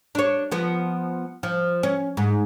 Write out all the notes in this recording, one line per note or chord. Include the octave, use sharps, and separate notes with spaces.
D4 C#5
F3 B3
F3
C#4
G#2